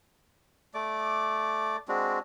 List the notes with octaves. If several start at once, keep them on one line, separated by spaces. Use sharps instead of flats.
A3 D5 D6
G#3 C4 D4 F#4